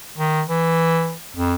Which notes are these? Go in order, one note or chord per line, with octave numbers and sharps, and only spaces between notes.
D#3
E3
F2